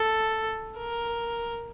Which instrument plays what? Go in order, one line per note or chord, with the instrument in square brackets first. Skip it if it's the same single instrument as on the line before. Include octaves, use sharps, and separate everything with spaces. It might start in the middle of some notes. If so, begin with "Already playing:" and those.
Already playing: [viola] A4
A#4